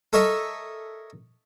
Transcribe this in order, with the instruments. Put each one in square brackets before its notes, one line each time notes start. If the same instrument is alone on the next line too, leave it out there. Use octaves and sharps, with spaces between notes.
[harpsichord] A4 A#4 C#5 D#5 E5